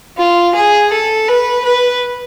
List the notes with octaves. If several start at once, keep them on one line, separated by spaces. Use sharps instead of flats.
F4
G#4
A4
B4
B4